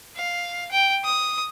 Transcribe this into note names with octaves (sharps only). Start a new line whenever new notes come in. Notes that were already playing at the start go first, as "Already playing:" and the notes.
F5
G5
D#6